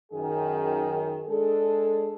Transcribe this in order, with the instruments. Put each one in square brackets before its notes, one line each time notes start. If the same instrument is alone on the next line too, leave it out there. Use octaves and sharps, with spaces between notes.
[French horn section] F#2 D#3 G#4
G#3 D4 G#4 A4